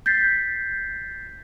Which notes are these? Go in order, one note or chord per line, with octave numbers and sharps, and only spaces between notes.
G6 A6 B6 C7